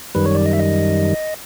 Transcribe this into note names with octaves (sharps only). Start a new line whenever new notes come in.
F#2 D#3 G3 B4
C#5
D5
D#5
E5
D#5